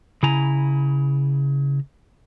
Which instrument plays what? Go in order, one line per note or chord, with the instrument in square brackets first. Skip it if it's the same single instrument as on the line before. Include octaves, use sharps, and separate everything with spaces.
[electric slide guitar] C#3 E4 G#5 A#5